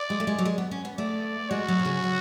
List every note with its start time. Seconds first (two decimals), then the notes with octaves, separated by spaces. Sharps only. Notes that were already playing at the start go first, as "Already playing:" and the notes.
Already playing: D5
0.10 G#3
0.20 A3
0.27 G#3
0.38 F#3
0.45 G#3
0.58 B3
0.71 C#4
0.85 B3
0.98 A3 D5
1.51 G#3 F#4
1.68 F#3
1.79 B2
1.85 C#3
2.03 F#3